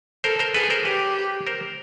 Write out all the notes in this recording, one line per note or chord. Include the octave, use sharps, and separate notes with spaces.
A4 A#4 C5
A#4 C5
G#4 A4 B4
A#4 C5
G4 B4 C#5
A#4 C5